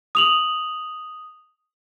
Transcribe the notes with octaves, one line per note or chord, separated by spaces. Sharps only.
D#6 F7 F#7